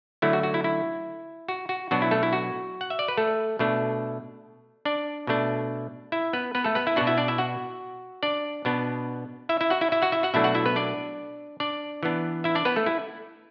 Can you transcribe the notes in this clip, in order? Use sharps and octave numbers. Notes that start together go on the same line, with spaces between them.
D3 F#3 A3 E4
F#4
F#4
E4
E4
F#4
F#4
B2 F#3 B3 D4 F#4
E4
A3 A4
E4
F#4
F#5
E5
D5
B4
A3 A4
B2 A3 D4
D4 D5
B2 A3 D4
E4 E5
B3 B4
B3 B4
A3 A4
B3 B4
E4 E5
B2 B3 D4 F#4 F#5
E4 E5
D4 D5
E4 E5
F#4 F#5
D4 D5
B2 B3 D4
E4 E5
E4 E5
F#4 F#5
E4 E5
E4 E5
F#4 F#5
E4 E5
F#4 F#5
B2 F#3 A3 D4 E4 E5
F#4 F#5
E4 E5
B3 B4
D4 D5
D4 D5
E3 B3 D4
E4 E5
D4 D5
B3 B4
A3 A4
E4